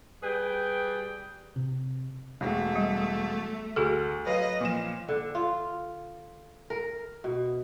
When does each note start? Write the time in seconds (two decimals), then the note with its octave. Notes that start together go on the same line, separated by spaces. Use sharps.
0.23 G3 G#4 B4 G5
1.56 C3
2.41 E1 A3
2.76 G3
3.76 D2 F#4 G#4 A4
4.26 F#3 B4 D#5 F5
4.61 A#2 F3 E7
5.08 D3
5.35 F4
6.70 A#4
7.24 B2